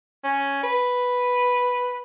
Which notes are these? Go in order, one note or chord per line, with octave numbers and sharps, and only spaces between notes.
C#4
B4